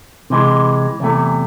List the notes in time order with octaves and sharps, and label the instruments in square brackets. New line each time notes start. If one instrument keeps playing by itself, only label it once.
[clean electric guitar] C3 E3 G#3
E2 C3 E3 A3